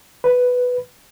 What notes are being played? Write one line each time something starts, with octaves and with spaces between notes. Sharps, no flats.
B4